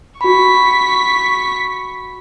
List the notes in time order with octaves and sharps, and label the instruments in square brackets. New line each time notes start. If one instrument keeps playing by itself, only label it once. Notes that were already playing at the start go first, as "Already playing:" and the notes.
[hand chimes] F#4 B5 [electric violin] C#6 B6